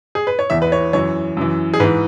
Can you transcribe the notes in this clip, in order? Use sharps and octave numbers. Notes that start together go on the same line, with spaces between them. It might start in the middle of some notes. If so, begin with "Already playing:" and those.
G#4
B4
C#5
E2 E3 E5
B4
C#5
F#2 E3 C#5
F#2 E3
G#4
G#2 E3 B4